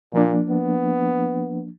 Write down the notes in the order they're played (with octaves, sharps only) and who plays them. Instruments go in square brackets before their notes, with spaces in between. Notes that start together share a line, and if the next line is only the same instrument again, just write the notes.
[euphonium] A#2 [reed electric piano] F3 A#3 D4
[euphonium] B3